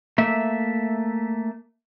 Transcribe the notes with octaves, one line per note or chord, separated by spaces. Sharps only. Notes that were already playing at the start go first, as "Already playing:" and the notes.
A3 A#3 E5